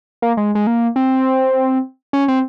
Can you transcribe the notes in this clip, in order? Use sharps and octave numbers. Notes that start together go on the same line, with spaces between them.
A#3
G#3
G#3
A#3
C4
C#4
C4